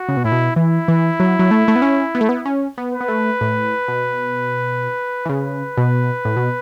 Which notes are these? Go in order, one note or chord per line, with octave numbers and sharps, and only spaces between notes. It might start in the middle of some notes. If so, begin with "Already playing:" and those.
Already playing: F#4
C#3
B2
A2 E4
B2
E3 E4
E3
F#3
F#3
A3
A3
B3
C#4
B3
A3
B3
C#4
B3
B4
B3
A3
A2
B2
E3
C#3 B4
B2
A2
B2